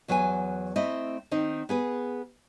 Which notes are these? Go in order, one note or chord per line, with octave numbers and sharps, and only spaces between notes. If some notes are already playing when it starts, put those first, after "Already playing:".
E2 F#3 B4 F5 G#5
A3 C4 E4 D#5
D#3 C4 D#4
B3 G#4 B4